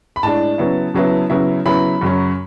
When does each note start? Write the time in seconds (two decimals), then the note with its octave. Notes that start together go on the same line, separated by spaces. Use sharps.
0.16 B5
0.23 A2 G#3 D4 A5
0.58 C#3 F#3 B3 E4
0.94 C#3 F#3 B3 E4
1.30 C#3 F#3 B3 E4
1.66 C#3 F#3 B3 E4 B5
2.01 F#2 C#3 F#3 C#4